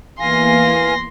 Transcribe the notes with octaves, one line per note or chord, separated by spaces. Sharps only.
E2 E3 A#3 F5 G#5 C6 A#6